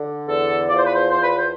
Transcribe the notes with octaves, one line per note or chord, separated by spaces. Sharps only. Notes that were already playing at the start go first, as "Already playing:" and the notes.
Already playing: D3
E2 A4
F3 D5
C5
B4
C5
E2 C5
B4
C5